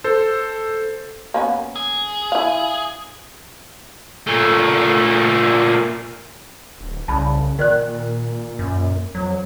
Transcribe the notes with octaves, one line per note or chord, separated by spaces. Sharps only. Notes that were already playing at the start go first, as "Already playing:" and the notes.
A4 C5
A#3 B3 C#4
G#4
E4 F5
A#2 A3
D1
C2 C#3 A5 B5
A#2 D#3 A#4 D5 F#6
F#2
F2 F#3